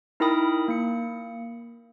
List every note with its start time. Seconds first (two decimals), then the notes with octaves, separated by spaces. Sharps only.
0.20 D#4 E4 A#4 G5 B5 D#6
0.68 A#3 C#7